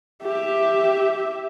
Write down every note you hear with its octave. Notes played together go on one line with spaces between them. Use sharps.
G4 E5